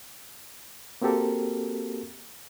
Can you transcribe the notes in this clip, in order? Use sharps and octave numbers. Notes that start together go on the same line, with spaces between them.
A#3 C4 F#4 G4 A4 A#4